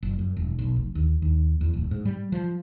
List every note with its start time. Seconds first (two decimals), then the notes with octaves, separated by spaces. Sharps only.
0.03 F#1
0.19 F#2
0.37 E1
0.59 B1
0.76 F1
0.95 D#2
1.22 D#2
1.61 E2
1.74 D1
1.91 G#2
2.05 G3
2.32 F3